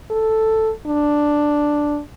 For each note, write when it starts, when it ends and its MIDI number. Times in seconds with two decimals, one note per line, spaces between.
0.10 0.71 69
0.86 2.00 62